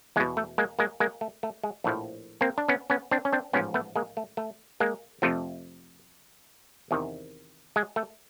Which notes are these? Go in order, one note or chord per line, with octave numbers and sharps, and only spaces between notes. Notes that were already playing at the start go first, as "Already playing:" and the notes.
E2 B2 G#3
A3
G#3 A#3
G#3 A#3
G#3 A#3
A3
A3
G#3
A#1 A2 F3 A3
A#3 C4
D4
B3 C#4
B3 C#4
C4 D4
C#4
C4 D4
A1 G#2 F3 B3 C#4
A3 B3
G#3 A#3
A3
A3
G#3 A#3
F2 C3 F3 A3
E2 C3 D#3
G#3
A3